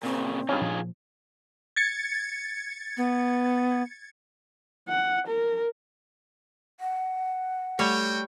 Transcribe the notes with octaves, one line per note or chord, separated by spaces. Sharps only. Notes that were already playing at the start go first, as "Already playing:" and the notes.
A#2 C#3 C4
G2 C#4 D#4 F4 G#4
A#2 F3
G#6 A6 C#7
B3
F#5
A#4
F#5
G3 A3 F#4 C#5 G5